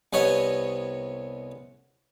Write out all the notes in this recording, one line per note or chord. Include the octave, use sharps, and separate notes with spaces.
C2 B3 C#5 D#5